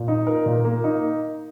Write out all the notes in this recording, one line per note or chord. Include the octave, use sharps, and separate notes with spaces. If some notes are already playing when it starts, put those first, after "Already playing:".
Already playing: A#2
D#4
A#4
A#2
A#3
D#4